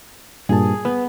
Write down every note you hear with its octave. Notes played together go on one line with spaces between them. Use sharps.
G2 A#2 G#4 A5
B3 B4